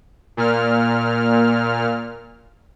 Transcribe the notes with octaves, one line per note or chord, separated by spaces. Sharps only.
A#2 F6